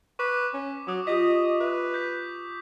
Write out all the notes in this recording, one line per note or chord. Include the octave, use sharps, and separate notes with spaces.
B4 C#6 D6
C#4
F#3 D6 D#6
F4 G4 D#5 B6
B4 E5
G6 B6